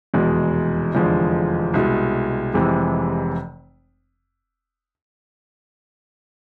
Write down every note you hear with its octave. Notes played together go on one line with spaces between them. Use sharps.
F1 E2 B2 G#3
F1 E2 D3 F3 G#3
C2 B2 G#3
F1 F2 C3 E3 G#3